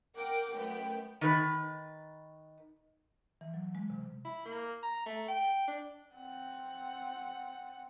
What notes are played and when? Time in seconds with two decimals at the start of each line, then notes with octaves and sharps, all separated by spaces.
0.16 A#4 F#5 G5 D6
0.53 F#2 A3 B3 G5
1.21 D#3 B4
3.41 E3
3.54 F#3
3.75 G#3
3.90 C3
4.25 E4
4.45 A#3
4.83 A#5
5.06 A3
5.28 G5
5.67 D4
6.13 C4 F#5